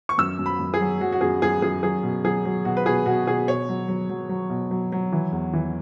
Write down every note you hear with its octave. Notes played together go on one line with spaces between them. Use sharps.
C#6
F#2 E6
F#2
B5
F#2
G#4
F#3
F#3 F#4
F#4
F#2 G#4
F#2 G#4
F#2 G#4
F#3 G#4
B2
F#3 G#4
F#3
B2 F#4
B4
B2 G#4
B2 F#4
B2 G#4
B2 C#5
F#3
F#3
F#3
F#3
B2
F#3
F#3
E3
E2
E3